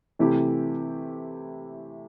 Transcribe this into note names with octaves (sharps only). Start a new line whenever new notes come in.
C3 E3 A3 E4 G4